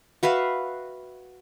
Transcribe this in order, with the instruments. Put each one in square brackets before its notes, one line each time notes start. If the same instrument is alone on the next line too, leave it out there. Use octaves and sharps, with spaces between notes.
[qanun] F#4 B4 E5 F5